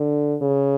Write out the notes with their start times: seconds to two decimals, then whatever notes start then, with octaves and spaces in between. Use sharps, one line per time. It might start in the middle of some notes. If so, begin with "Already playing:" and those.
Already playing: D3
0.41 C#3